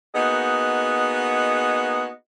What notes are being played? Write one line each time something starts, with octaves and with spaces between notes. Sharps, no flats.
A#3 B3 D#4 F#4 G#4 D#5